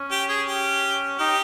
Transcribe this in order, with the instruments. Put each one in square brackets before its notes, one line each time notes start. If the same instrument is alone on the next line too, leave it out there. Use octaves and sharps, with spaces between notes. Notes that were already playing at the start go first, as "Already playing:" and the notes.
Already playing: [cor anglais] C#4
[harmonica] G4
G#4
G4
[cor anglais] D#4 [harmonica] G4